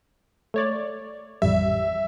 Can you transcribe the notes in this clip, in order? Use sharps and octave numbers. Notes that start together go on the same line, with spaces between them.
A3 C#5 D5
A1 F2 G3 E5